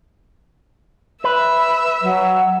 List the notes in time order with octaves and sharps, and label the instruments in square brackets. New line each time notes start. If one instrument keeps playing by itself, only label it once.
[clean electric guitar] B4 [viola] E5
[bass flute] F#3